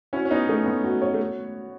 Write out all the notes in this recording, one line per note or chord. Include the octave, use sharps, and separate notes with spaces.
C#4 E4 F#4
C#4
B3 D#4 C#5
A3 B3 C#4
B3
F#4
C#5
A3